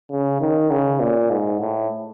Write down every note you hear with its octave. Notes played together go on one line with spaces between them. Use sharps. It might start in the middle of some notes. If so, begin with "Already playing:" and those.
C#3
D#3
C#3
A#2
G#2
A2